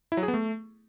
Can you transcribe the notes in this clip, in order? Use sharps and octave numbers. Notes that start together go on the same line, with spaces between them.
E4
F#3
G#4
B3
A3